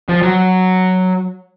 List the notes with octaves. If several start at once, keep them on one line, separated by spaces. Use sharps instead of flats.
F3
F#3